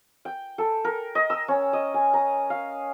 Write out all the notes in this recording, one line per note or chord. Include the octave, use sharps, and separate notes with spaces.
G5
A4
A#4
D#5
E6
C#4
D#5
G#5
A#5
F5